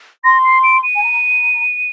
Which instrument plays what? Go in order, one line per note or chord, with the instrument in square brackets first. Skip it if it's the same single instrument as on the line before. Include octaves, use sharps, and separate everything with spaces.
[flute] C6 [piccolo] A#6
[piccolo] C7
D7
D#7
[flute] G#5
A#5